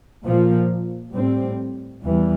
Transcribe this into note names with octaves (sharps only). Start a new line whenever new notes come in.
A#2 F3 A#3
A2 G3 C4
E2 E3 G3